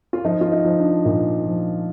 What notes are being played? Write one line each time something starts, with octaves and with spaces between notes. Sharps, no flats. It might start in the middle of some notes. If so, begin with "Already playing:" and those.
F4
F3 D#4
F4
D#4
F3
D4
A#2 D#4
F3